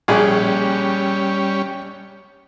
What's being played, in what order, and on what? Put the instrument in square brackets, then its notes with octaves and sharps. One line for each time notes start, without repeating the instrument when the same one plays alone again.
[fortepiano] A#1 G#4 [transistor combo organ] G3 C#4